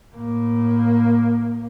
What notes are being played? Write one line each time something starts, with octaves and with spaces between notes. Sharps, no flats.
A2 A#3